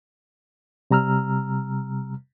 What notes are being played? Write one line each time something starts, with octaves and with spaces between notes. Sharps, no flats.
C3 G3 A#5 E6 F6